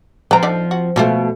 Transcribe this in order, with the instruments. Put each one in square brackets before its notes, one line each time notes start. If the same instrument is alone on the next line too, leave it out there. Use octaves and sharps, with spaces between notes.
[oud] F3 C4 [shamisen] B4 A#5
[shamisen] D3 D#4 D5
F#4
[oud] B2 A3 [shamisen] A#3 F4 C5